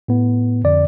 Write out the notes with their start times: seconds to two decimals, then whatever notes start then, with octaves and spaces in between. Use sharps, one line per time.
0.08 A2 B3
0.64 F2 D3 D5